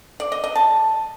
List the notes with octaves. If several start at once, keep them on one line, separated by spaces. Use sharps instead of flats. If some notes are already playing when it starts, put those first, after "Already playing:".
D5
D#5
D#5
A5